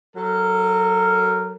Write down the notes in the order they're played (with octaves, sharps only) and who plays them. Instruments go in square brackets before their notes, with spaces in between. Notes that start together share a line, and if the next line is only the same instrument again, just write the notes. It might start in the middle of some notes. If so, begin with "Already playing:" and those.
[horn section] F#3 A4 A#4